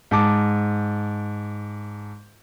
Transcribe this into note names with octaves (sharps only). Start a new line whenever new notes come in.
G#2 A5 D6